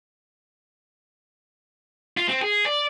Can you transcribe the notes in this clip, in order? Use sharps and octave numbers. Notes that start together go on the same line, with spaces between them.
F4
C4
G#4
D5